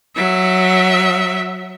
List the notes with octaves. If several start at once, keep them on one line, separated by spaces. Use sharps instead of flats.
F#3 E5